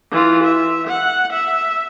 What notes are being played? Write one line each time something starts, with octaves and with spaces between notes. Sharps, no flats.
E3 F4
E5
F#5
E5